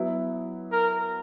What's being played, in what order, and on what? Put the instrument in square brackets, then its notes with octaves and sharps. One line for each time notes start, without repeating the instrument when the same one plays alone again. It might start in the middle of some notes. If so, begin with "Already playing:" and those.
Already playing: [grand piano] F#3 B3 E4
[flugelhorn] A#4